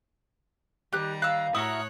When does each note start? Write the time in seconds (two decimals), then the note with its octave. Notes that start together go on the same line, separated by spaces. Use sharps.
0.93 D#3 G3 G4 A#5 F#6
1.22 F5 E6 F#6
1.55 A2 E4 F#4 A#4 C#5 D#6 F#6